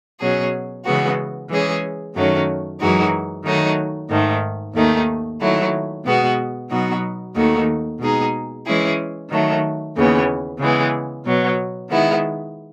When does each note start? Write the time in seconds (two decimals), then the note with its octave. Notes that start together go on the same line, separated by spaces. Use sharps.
0.20 B2 F#3 C#4 G#4
0.84 C#3 E3 G#3 B3 F#4
1.50 E3 G#3 C#4 G#4
2.15 F#2 D#3 F#3 A3 C#4
2.80 F#2 E3 G#3 D#4 F#4
3.45 D#3 F#3 A3 D#4
4.10 G#2 D#3 A3
4.75 D#2 D#3 A3 D#4
5.40 D#3 F#3 A3 E4
6.05 B2 G#3 B3 F#4
6.70 B2 F#3 B3 D#4 F#4
7.35 D#2 D#3 A3 D#4 F#4
8.00 B2 G#3 D#4 G#4
8.65 E3 G#3 C#4 E4 G#4
9.30 D#3 F#3 A3
9.96 D#2 C#3 E3 B3
10.60 C#3 E3 G#3 B3
11.25 B2 F#3 B3
11.90 D#3 G#3 B3 E4